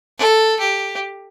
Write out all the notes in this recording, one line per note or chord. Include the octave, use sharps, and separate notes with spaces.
A4
G4